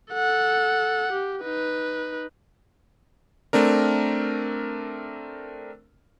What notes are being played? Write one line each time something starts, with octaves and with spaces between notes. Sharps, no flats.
A4 F#5
G4
D#4 B4
A3 C4 D4 A#4